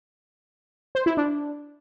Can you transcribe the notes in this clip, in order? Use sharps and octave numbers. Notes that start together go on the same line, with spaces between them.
C5
E4
D4